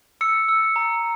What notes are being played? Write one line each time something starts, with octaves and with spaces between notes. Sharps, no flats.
E6 C#7
E6
A#5